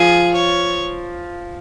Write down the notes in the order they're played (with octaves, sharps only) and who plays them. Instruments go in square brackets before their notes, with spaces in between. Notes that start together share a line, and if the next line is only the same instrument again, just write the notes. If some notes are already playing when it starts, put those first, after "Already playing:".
Already playing: [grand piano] F3 F4 [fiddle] G#4
[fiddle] C#5